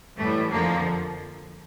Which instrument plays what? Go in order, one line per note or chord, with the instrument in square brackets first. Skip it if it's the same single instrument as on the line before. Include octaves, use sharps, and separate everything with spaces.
[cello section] A2 E3 G3 A3
F2 D3 F3 A#3